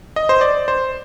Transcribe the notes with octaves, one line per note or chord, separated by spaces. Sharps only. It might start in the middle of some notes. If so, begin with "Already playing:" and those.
D#5
C5
D5
C5